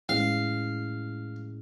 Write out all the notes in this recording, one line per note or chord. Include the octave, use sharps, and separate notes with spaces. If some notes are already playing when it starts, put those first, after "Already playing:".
A2 E3 G#3 C#4 F5